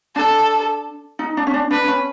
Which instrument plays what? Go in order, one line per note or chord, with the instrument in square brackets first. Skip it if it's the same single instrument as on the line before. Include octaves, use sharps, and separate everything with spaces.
[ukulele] D4 [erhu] A4
[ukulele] D#4
D4
C#4
D4
[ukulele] D4 [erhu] B4
[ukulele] C#4